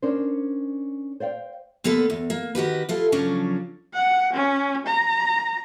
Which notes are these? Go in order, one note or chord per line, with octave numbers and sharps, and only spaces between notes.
C#4 D4 A#4 C5
C5 D5 F5 G5
D3 A#3 B3 D4 A4 B4
E2
A#3
D#3 F#4 G4 B4
E4 F4 A4
C#3 F3 F#3 C#4 D4 A4
F#5
C#4
A#5